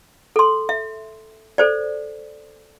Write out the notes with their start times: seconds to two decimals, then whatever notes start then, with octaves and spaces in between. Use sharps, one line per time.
0.36 A4 C6
0.69 E5
1.58 A4 C5 D5